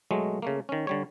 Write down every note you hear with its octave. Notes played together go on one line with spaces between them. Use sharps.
B2 F#3 G#3 A3
C#3 A3 A#3
D#3 C#4
D3 G3 C#5